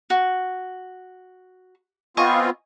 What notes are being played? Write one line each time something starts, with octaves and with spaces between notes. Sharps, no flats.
F#4
B3 C4 F4 D#5 G#5 C#6